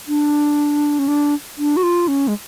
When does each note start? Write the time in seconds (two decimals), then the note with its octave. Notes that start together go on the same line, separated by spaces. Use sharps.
0.08 D4
0.99 C#4
1.08 D4
1.58 D4
1.77 F#4
1.83 F4
2.08 C#4
2.28 G#3